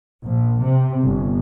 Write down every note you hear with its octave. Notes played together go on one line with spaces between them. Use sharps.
A#1
C3
G1